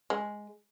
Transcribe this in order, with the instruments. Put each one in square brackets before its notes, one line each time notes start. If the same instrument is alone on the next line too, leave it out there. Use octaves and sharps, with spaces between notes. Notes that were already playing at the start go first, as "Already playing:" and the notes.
[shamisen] G#3